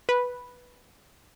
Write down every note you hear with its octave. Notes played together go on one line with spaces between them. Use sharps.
B4